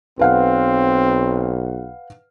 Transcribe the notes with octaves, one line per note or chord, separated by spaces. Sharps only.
B1 C4 B4 F5 F#5